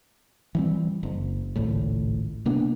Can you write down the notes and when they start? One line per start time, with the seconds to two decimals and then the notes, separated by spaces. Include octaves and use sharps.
0.55 E3 G3 C4
1.03 F#1
1.56 G#1 C#2 A2
2.46 C3 A#3 B3 D4